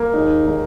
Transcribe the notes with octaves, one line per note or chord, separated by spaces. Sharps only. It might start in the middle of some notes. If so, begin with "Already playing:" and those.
Already playing: A#3
D#2 D#3 G#3 D#4
D#3 G#3 D#4